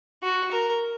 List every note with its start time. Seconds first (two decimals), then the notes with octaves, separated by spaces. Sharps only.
0.23 F#4
0.51 A#4